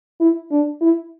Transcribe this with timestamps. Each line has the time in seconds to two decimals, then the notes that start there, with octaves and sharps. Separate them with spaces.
0.20 E4
0.51 D4
0.81 E4